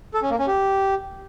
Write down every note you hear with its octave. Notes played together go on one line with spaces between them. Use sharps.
A4
C#4
A#3
C#4
G4